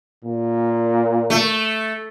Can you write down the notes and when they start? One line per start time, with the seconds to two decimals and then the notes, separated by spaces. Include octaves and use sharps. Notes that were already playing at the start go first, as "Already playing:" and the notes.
0.24 A#2
1.30 A3